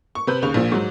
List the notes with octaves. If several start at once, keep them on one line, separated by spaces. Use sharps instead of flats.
C#6
C3 B4 B5 G6
D#2 C#3 C#6 F7
A#1 A#2 F3
G#2 F#3